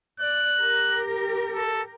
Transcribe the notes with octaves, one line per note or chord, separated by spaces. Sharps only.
D5 F#6
G4 A#4
A4